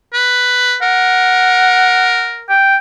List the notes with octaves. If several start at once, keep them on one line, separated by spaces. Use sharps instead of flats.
B4
A#4 F#5
G5